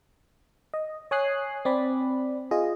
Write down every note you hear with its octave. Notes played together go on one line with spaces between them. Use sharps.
D#5
C#5 G#5 D#6 F#6 C7
C4 D5 B5
F4 G#4 D#5